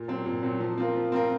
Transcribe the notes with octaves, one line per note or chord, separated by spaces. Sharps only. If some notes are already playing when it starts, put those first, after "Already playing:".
Already playing: A#2
F#3 C4
A#2
F#3 C4
F3
C4 F4 A#4
F3
C4 F4 A#4